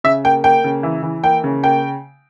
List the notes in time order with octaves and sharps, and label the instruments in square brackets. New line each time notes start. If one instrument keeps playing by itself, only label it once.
[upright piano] C#3 E5
A#3 G5
A#3 G5
C#3
E3
E3
A#3 G5
C#3
A#3 G5